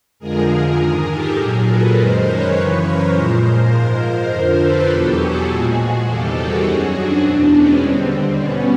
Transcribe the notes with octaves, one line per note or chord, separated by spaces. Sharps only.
F2 D3 F3 G#3 G#4 A#4
G#2 D#3 G#3
G4 A4
A#2 F#3 G#4 A#4
A4 B4
F#2 D#3 G#3 A#4 C5
B4 C#5
F#2 C#3 E3
A#4 C5
A#2 F3 G#3
G#2 F3 G#3
A#4 C5
F2 D3 F3
A4 B4
E2 B2 F#3 G4 A4
F#4 G#4
A#2 F3 G#3 F#4 G#4
E2 C3 D#3 G3 G4 A4
F#4 G#4
F#2 D#3 F#3
C4 D4
E2 B2 G#3
B3 C#4
D#2 D3 G3 C4
C4
B2 G3 B3 C#4